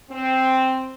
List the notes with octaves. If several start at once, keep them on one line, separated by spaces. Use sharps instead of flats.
C4